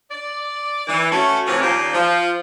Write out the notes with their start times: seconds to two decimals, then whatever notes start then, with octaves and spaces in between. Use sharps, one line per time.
0.11 D5
0.87 E3
1.11 A3 C#4 F#4
1.46 A2 C3 E3 F3 C#4
1.61 D#2 A#2 F3 C#4 C5 D5
1.94 F3